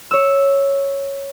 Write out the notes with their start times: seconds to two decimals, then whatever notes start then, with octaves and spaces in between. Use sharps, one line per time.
0.11 C#5 E6